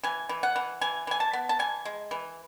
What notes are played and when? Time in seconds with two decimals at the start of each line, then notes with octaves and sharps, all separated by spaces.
0.04 E3 G#5
0.29 E3
0.43 F#5
0.56 E3
0.81 E3 G#5
1.07 E3 G#5
1.20 A5
1.33 B3
1.49 A5
1.59 E3 G#5
1.85 G#3
2.11 E3